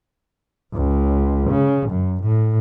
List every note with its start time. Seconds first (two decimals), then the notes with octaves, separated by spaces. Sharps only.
0.74 C#2
1.50 C#3
1.90 F#2
2.23 A2